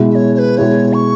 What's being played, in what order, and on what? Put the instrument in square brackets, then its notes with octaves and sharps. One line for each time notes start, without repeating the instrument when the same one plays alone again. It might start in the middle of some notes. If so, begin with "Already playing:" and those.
Already playing: [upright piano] B2 G#3 E4
[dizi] E5
C#5
C#5
B4
[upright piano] B2 G#3 E4 [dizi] C#5
[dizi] C#6